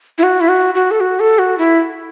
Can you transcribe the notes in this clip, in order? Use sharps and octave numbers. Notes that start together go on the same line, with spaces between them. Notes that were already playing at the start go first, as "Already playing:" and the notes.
E4
F#4
E4
F#4
F#4
A4
F#4
A4
F#4
E4